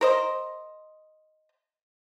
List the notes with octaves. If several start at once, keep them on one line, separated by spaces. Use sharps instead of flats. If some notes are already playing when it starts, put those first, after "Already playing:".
A#4 C5 D#5